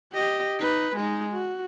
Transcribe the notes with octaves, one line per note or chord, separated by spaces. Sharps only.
G4 D#5
D#4 B4
G#3 D#4
F#4